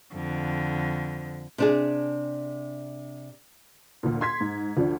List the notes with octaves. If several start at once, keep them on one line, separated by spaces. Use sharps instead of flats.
F2 D3
C3 D4 G#4
D2 A#2
C6 G#6 B6
G#2
D2 F3 D4